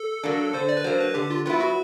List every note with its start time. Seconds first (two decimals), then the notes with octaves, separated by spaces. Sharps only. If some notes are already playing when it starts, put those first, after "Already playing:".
Already playing: A4
0.24 F#3 A#3 D4
0.53 D3 C5
0.69 D5
0.77 B4
0.84 F#3 A#3 D4 C5
1.00 B4
1.14 D3 G4
1.31 F4
1.45 F#3 B3 E4 F4
1.60 F#4